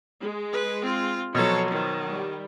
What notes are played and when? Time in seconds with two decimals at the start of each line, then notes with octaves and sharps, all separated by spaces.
0.23 G#3
0.53 B4
0.82 C4 F4
1.35 B2 F3 F#3 A4 C#5
1.70 D#3
2.06 G3